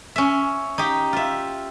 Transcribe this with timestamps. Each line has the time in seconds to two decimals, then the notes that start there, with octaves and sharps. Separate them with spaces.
0.16 C#4 E5
0.78 D#4 G4
1.13 F4 E5